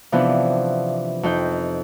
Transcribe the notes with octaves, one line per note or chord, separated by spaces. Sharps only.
C3 E3 F3 B3 D4 E4
F2 D#4 G6